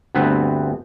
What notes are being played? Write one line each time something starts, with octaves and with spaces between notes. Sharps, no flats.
D2 G2 B3 C4 B4 F#5